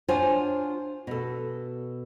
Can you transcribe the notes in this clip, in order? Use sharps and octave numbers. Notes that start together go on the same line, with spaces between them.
D4 F4 C5 C#5 F#5 G#5
B2 A4